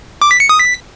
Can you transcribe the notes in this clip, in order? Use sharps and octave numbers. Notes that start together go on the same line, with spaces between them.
D6
B6
C#7
D#6
B6